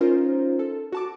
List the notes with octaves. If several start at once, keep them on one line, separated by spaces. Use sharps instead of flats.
C#4 D#4 F4 A#4 C5
A4
F#4 A5 D6